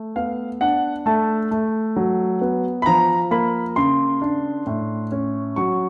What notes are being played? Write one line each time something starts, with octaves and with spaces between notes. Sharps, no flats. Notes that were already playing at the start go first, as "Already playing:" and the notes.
Already playing: A3
B3 F5
D4 F#5
A3 A5
A3
F#3
B3
B5
F3 A#5
A#3 B5
C#3 C6
D4
A2
C#4
F#3 C#6